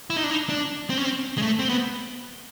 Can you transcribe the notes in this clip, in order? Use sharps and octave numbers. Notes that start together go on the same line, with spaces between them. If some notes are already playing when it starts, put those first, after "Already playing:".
E4
D#4
D4
D#4
D4
C4
C#4
C4
G#3
A3
C4
B3